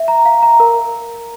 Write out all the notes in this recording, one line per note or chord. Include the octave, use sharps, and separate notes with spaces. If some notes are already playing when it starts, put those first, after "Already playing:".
Already playing: E5
A#5
F5
A#5
A#4